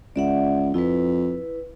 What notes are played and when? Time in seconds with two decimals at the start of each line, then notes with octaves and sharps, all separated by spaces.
0.16 C#2 D5 E5 F#5
0.74 F2 E4 B4